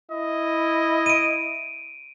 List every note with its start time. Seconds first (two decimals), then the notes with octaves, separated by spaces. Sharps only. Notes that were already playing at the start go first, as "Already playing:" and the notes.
0.11 E4 D#5
1.06 D7 D#7